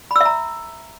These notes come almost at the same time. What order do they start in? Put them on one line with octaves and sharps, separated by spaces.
B5 E6 E5 A#5